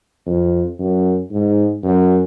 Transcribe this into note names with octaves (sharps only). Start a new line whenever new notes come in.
F2
F#2
G#2
F#2